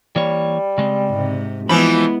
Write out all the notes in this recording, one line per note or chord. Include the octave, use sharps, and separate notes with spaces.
E3 G3 A#3 C#5
C#3 G#3 C4
G#2 C3
E3 F3 G#3 B3 E4 B5